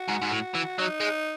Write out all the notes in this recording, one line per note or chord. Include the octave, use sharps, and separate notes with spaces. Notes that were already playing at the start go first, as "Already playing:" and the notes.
Already playing: F#4
G#2
G#2
A2
E3
F#3 D#4
G#3